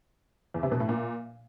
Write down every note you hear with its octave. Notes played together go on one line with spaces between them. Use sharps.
E2
C3
B2
A2
A#2